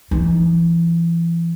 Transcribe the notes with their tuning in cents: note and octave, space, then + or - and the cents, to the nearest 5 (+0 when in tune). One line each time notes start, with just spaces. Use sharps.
E3 +35 D#4 +0